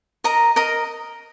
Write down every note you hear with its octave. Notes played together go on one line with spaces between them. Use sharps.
A#4 D#5 A#5
A#4 D#5 A#5